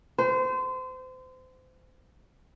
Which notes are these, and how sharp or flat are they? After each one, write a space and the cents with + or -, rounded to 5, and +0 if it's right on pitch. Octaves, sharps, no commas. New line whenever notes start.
C5 -30